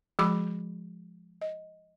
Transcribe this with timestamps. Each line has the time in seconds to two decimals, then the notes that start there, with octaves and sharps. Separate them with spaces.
0.19 F3 G#3 F#4 G#4 B5 D6
1.42 D#5